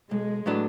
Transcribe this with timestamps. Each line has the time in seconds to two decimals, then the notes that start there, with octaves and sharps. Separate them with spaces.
0.11 B1 G#3
0.46 A2 F#3 B3 D4